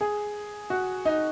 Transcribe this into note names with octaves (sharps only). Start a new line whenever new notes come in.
G#4
F#4
D#4